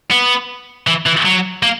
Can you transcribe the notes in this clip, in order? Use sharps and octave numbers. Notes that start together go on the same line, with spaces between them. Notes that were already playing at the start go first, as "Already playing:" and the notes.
B3
E3
E3
F#3
A#3